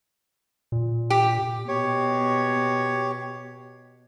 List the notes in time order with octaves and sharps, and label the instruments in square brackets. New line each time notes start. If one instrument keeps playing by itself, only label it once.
[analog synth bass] A#2
[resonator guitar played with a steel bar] G4
[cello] B2 [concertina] G4 C#5